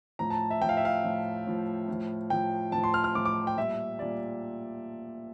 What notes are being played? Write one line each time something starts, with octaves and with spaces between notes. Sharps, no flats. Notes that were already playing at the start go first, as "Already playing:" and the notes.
A2 F3 A#5
A5
E5
A2 F3 G5
F5
E5
F5
A2 F3
A2 F3
A2 F3
A2 F3 G5
A2 F3 A5
C6
F6
F6
A2 F3 D6
D6
G5
A#2 G3 E5
A#2 G3 D5